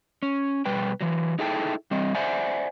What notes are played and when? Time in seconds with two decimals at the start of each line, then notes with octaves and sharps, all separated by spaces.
0.23 C#4
0.65 B2 G3 B4 G5
1.01 E3 F#3
1.39 D#4 E4 G#4 A4 G5 A5
1.91 G3 C4 D#5
2.15 C5 D5 E5 F#5 G#5